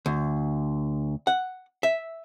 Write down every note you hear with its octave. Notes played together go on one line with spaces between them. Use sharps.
D2
F#5
E5